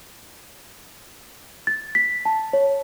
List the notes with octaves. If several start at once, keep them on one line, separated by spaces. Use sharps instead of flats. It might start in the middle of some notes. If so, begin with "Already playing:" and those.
A6
B6
A5
C#5